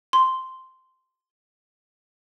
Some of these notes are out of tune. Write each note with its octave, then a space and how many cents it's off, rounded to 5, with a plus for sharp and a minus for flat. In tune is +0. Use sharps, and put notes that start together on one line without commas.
C6 -5